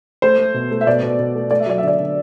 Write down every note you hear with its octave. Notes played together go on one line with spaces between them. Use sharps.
A3 C5
A3
B2
A3
E5
B2 D5
B2
B2
A3
A3 D5
E5
F#3 D5
E5
D3 D5
D3